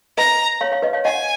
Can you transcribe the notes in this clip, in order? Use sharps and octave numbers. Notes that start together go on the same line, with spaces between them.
B4 D#5 A#5
C#5 F5
C#5 F5
B4 D#5
C#5 F5
D#5 F#5 G#5